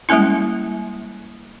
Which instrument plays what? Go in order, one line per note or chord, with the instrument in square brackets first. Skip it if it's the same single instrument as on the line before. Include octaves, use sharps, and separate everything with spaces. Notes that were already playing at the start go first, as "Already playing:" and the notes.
[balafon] G3 G#3 A#3 C#4 E4